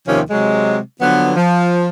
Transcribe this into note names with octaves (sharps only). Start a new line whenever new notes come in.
D#2 C3 D#3 F3 C#4
C3 F#3 G#3
D3 F3 F#3 B3
F3